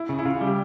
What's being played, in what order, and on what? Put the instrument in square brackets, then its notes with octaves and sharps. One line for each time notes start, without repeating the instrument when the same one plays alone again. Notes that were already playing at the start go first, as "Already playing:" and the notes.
Already playing: [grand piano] E4
[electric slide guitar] C#3
[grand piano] E4
[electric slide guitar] C#3 [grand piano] F4
[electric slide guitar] G3
[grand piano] G4